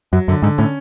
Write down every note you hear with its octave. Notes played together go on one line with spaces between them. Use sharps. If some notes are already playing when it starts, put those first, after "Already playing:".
F#2 F#3
F#2 D3
G#2 D3
A2 C#4